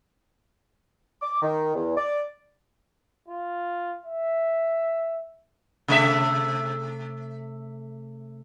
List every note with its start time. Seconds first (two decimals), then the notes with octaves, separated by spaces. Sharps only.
1.22 D6
1.42 D#3
1.75 E2
1.97 D5
3.28 F4
4.06 E5
5.88 C3 A3 E5